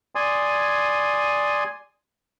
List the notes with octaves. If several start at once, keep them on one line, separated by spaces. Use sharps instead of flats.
D5 G#5 C6 D#6